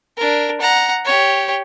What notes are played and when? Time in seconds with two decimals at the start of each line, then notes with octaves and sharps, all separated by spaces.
0.17 D4 A#4
0.61 F#5 A#5
1.05 G4 C#5